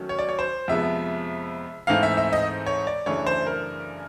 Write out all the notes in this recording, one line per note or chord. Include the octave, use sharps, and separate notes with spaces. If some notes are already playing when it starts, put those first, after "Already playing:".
Already playing: D#3 F#3 A3 C#4
C#5
D5
C#5
C5
F2 C3 F3 G#3 B3 E5
G#2 E3 A3 C4 D#4 F5
E5
E5
D#5
C#5
D5
F#2 C#3 E3 A3 D4 C#5
C5
A#4